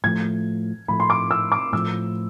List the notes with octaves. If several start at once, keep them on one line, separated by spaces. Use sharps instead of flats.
A2 F3 A3 G#6
A2 F3 A3 B5
C6
D6
E6
D6
A2 F3 A3 E6